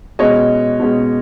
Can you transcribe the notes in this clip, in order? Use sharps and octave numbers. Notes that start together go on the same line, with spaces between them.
B2 G#3 C#4 C#5 D#5
B2 G#3 C#4